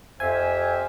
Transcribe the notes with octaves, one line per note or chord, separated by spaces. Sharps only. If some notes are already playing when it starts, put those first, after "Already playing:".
F2 F4 G4 C5 E5 G#5